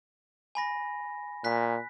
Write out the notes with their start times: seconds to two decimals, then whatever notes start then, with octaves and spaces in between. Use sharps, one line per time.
0.55 G#5 B5 A#6
1.44 A#2 F#6 B6